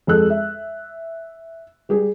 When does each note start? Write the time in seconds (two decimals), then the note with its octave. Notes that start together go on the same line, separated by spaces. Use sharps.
0.07 F2 G#3 A4 E6 F#6
0.30 E5
1.89 G3 G4 G#4